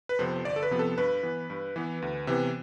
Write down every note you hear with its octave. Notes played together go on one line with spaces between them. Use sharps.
B4
F2 C3 F3 B3 C5
G1 D5
A4
B4
F2 C3 F3 B3
A4
G2 B4
E3 B3
G2
E3 B3
D2
C3 E3 B3